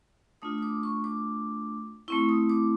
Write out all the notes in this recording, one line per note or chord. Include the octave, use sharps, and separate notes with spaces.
A3 D4 F4 D#6
D#6
D6
C#6
D6
A3 C4 E4 C#6
D#6
D6